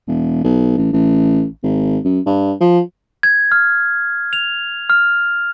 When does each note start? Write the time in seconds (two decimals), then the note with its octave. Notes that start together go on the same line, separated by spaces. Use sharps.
0.08 E1
0.44 B1
0.78 A1
0.93 A1
1.63 G#1
2.05 F#2
2.26 G2
2.61 F3
3.23 G#6
3.52 F6
4.33 F7
4.90 F6